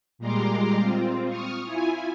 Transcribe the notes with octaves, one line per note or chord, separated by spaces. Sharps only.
A#2 G3 G#3 A#5 C6 D6
C4 F4
C#6 D#6 F6
E4 F4 G#5